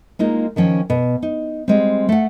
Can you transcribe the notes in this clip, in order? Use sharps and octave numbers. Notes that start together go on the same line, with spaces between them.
G#3 A#3 D#4 F4
D#3 F3 C#4 G5
B2
D#4
G3 G#3 C4
A3 F#5